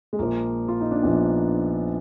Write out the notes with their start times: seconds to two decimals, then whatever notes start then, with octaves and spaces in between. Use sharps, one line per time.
0.13 G#3
0.19 A#1 A#2 F3 A#3
0.68 F4
0.80 D#4
0.91 D4
1.03 A#1 A#2 F3 B3